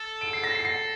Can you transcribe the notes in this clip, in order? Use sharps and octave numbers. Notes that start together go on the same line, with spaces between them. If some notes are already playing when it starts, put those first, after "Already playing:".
Already playing: A4
D7
C7
A#6
C7
C7